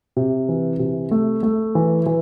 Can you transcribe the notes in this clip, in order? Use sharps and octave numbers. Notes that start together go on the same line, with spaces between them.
C3
E3
C3
A3
A3
E3
E3